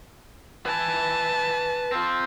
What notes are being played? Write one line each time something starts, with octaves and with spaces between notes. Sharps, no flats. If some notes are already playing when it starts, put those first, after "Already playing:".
B4 G#5 A5
C4 F4